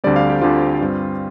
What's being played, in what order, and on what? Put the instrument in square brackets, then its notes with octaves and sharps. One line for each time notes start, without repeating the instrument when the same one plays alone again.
[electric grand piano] D2 D3 G3 C4 D5
F5
G4
D2 D3 G3 C4 F4
G2 G3 C4